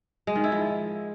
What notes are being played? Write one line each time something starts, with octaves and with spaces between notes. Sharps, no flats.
G#3
D#3
E4
F3